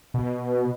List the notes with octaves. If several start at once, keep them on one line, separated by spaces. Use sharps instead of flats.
B2